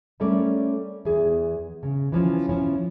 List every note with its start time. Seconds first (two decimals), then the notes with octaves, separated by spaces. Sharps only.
0.20 G3 A3 C#4 A4 A#4 D5
1.05 E2 G#4
1.83 C#3
2.12 E3 F3 C#4
2.49 F3 C#4 E4